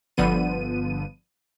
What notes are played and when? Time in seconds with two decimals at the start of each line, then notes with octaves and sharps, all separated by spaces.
0.17 G1 D3 F3 B3 D#7